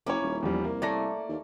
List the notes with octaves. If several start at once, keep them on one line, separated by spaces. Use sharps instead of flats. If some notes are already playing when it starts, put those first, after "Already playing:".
F#1 A#3 C#4 E4 C#5 D6
D#1
E2 F3 G3
C2 A#3
A3 A#3 C#5 D5 A#6
D#2